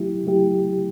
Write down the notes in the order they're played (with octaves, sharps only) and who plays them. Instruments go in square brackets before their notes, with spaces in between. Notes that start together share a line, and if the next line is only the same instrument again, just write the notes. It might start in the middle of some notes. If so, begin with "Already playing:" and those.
Already playing: [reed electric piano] F#3 A3 E4 G4
F#3 A3 E4 G4